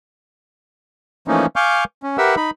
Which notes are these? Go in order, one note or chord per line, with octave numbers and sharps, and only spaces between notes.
E3 F3 A3 A#3 C#4 D#4
F5 G#5 C#6 D6 F6 G6
C#4
G4 A#4 B4 E5 F#5 E6
D#4 B5